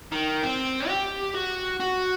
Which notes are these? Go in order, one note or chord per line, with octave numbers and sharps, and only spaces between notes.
D#3
C4
G4
F#4
F#4